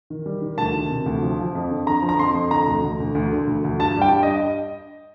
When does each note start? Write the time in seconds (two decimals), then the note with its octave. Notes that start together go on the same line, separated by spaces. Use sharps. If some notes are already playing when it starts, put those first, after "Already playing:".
0.10 D#3
0.26 G3
0.42 D#3
0.58 D2 A5
0.74 D#3
0.91 C3
1.06 D2
1.22 F3
1.39 F3
1.55 F2
1.71 D3
1.86 D3 A#5
2.02 F3
2.09 A#5
2.19 F2 C6
2.35 F2
2.51 D3 A#5
2.67 D2
2.84 D2
3.00 D2
3.15 D2
3.32 D3
3.47 D2
3.64 D2
3.79 G2 A5
3.96 G3
4.01 G5
4.12 G2
4.23 D#5